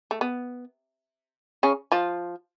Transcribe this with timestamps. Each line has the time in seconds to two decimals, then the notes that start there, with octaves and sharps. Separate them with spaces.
0.11 A3
0.21 B3
1.63 C#3 C#4
1.92 F3 F4